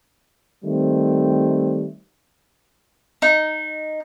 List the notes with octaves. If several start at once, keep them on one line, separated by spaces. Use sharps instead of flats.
D#3 G3 A3 C4
D#4